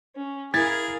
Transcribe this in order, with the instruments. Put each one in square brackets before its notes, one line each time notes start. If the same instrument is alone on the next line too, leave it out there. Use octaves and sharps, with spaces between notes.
[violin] C#4
[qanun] E4 [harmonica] G#4 [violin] A#4 F5 [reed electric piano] G#6 A6